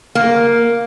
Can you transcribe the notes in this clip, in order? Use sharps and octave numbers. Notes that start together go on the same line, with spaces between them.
A#3